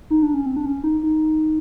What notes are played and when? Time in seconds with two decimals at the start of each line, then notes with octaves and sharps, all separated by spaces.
0.10 D#4
0.23 D4
0.34 C#4
0.46 C4
0.56 D4
0.66 C#4
0.84 D#4
1.03 D#4